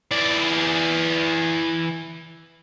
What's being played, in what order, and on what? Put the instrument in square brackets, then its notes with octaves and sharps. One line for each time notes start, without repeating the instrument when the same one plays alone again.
[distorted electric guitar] E3 D5